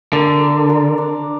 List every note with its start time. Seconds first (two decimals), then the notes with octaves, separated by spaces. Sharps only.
0.13 D3 A#4
0.41 A#4
0.69 A#4
0.98 D4